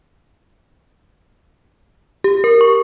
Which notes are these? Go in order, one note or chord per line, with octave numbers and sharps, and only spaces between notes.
G4
A#4
C#6